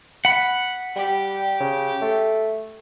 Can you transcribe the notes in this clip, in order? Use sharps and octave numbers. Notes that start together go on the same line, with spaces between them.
F#5 B5
G3 G4
C#3
A3